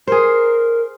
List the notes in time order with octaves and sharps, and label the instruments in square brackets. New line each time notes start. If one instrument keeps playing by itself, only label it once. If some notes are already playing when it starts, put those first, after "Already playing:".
[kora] G#4 C5 [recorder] A#4